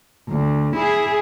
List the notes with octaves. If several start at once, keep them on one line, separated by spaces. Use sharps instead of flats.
D2
E4 G#4